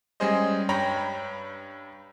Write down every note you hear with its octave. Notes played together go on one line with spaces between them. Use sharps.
G3 G#3 C#4 G#4 C5 D#5
G2 C#5 G5 A#5 B5 A#6